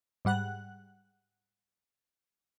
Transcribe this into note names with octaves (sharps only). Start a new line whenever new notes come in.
G#2 G3 F#5 F#6